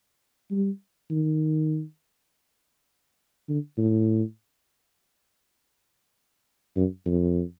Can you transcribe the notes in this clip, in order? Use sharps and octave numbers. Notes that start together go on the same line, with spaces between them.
G3
D#3
D3
A2
F#2
F2